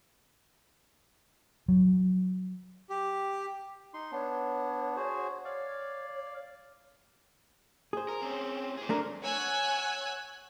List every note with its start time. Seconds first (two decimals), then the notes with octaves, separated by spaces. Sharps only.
1.68 F#3
2.90 G4
3.94 D#4 C6
4.12 B3 D4 C#5
4.96 F#4 G#4 C5
5.45 C#5 D5 F5
7.93 G#4 C5
8.08 A#4
8.22 C4 C#4
8.77 G#4 C5
8.89 A3 D4 A#4
9.22 C#5 F#5 G#5 E6 F#6 G#6